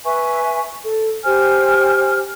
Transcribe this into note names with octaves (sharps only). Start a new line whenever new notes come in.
B4 E5 G#5 C#6
A4
G4 C5 G#5 F6